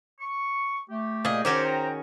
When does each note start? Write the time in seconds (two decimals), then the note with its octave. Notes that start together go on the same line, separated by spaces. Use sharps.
0.21 C#6
0.89 A3 G4
1.25 A#2 G#4 D#5
1.45 D#3 C#4 D#4 F#4 C5 D6
1.65 G5 A#5